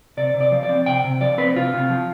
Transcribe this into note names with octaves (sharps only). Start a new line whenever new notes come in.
C3 D5
C3
D5
F3
D5
C4
C3 G5
C3
F3 D5
C4 B4
C3 F4
C3
F3